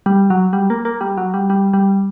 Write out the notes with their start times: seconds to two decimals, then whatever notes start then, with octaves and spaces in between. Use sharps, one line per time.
0.06 G3
0.30 F#3
0.53 G3
0.70 A#3
0.85 A#3
1.01 G3
1.17 F#3
1.34 G3
1.50 G3
1.73 G3